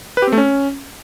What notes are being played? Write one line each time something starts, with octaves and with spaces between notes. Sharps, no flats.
B4
G4
C4
A3
C#4